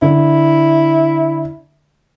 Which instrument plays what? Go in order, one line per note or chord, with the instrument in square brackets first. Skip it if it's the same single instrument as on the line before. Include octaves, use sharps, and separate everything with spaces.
[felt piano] D3 [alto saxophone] E4